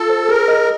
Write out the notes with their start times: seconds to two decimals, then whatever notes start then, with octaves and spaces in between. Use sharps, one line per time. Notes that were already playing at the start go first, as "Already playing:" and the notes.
Already playing: F4 A4
0.10 C5
0.29 G#4 A#4
0.48 D#5